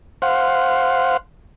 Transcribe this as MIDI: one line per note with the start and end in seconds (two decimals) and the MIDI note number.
0.22 1.17 72
0.22 1.17 77
0.22 1.17 78